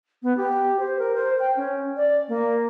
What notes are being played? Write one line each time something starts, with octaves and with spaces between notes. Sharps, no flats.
B3
G4
C5
A#4
C5
G5
C#4
D5
A#3